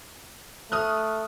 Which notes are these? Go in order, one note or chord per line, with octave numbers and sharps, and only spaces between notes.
A3 D#6 F6 F#6